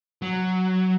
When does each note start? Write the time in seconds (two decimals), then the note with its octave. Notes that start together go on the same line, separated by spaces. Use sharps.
0.22 F#3